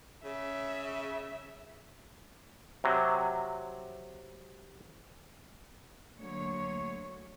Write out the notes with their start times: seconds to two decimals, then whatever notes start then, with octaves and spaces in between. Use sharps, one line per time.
0.25 C#3 E5
2.84 C3 F#3
6.17 D2 D3 F#3 A#3 C#5